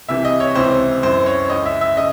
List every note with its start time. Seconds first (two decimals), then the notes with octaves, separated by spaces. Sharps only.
0.09 C2 C3 E3 E5
0.25 D#5
0.40 C#5
0.56 C#2 C3 E3 C5
1.03 F#2 E3 C5
1.26 C#5
1.50 C#2 C#3 E3 D#5
1.66 E5
1.81 E5
1.97 C#3 D#5